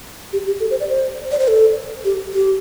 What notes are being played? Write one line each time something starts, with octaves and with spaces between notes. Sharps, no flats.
G4
G4
A4
C5
D5
C5
D5
C5
A4
G4
G4